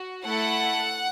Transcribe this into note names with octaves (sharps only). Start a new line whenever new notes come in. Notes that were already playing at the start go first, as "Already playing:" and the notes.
Already playing: F#4
A3 E4 A4 F#5